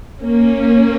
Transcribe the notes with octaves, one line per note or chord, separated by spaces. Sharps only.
A#3 C#4